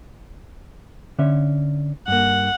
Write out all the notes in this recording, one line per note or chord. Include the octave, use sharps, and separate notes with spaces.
D3 C#4 E5
G2 A#3 F#5